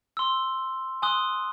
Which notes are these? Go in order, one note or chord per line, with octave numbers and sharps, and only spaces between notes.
C6 E6
G#5 C6 D#6 F#6